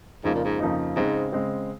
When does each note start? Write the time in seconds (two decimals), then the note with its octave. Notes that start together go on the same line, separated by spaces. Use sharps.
0.24 F2 G#2 C#3 F3 A#3 D#4
0.35 A#2
0.45 G#2
0.60 F2 C#3 F3 A#3 D#4
0.96 G#2 C#3 G#3 C4
1.32 C#3 G#3 C4